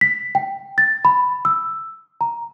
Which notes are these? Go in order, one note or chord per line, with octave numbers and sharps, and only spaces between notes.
B6
G5
A6
B5
E6
A#5